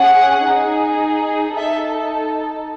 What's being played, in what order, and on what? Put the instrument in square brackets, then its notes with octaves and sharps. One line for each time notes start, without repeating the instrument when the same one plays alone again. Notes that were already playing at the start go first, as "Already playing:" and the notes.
Already playing: [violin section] C#4 G#4 F#5
D#4 G#4
D#4 A4 E5